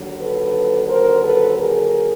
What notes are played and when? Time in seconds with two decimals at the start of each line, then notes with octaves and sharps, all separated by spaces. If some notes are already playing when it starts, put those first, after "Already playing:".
Already playing: D#2 D3 F#3
0.20 A4 B4
0.88 A#4 C5
1.23 A4 B4
1.58 G#4 A#4